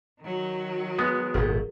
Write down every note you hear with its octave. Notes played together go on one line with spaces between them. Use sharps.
D#3 F#3
G#3 B3
D#1 G#1 B2 G#4 A#4